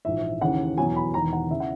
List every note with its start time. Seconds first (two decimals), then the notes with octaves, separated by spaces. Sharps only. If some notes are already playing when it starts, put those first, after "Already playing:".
0.05 A#1 G#2 E3 E5
0.41 D#2 C#3 E3 F#5
0.77 E2 B2 F#3 G#5
0.96 B5
1.14 E1 E2 D#3 A#5
1.33 F#5
1.50 C#3 E3 E5
1.60 F#5